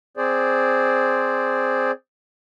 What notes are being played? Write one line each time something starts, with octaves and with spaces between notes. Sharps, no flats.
C4 G#4 C5 D5